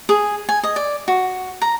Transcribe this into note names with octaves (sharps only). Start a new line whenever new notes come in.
G#4
G#5
D#5
D5
F#4
A#5